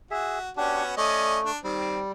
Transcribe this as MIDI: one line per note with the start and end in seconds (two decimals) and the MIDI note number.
0.11 0.49 66
0.11 0.39 68
0.11 0.39 76
0.57 0.95 59
0.57 0.95 61
0.57 0.83 62
0.57 0.95 66
0.57 0.83 67
0.97 1.51 57
0.97 1.39 61
0.97 1.39 74
0.97 1.39 75
1.44 1.58 62
1.64 2.00 51
1.64 2.12 55
1.64 2.00 60